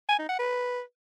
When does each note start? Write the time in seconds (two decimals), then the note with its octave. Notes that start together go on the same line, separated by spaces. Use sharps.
0.09 G#5
0.19 D#4
0.29 F#5
0.39 B4